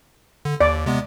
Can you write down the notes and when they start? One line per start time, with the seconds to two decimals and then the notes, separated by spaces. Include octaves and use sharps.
0.45 D3
0.61 D#2 D5
0.86 C3 G#3 B3